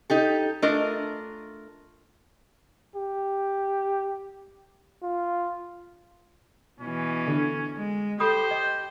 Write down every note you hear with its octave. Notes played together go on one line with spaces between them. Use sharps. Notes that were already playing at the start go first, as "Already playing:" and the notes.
D#4 G4 A4
A3 D4 F4 A#4 D#5
G4
F4
B2 E3 C#4
D3
G#3
G4 A4 C5 B5 D#6
D#5